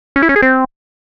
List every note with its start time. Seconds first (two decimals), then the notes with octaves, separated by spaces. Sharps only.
0.16 C#4
0.22 E4
0.29 C#4
0.36 G#4
0.42 C4